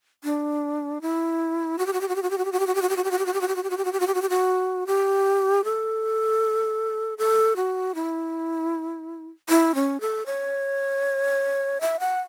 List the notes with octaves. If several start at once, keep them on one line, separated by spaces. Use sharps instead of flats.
D4
E4
F#4
G4
F#4
G4
F#4
G4
F#4
G4
F#4
G4
F#4
G4
F#4
G4
F#4
G4
F#4
G4
F#4
G4
F#4
G4
F#4
G4
F#4
G4
F#4
G4
F#4
G4
F#4
G4
F#4
G4
F#4
G4
A4
A4
F#4
E4
E4
C#4
A4
C#5
E5
F#5